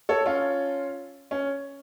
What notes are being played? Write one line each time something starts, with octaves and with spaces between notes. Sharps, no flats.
A4 C#5
C#4 F4
C#4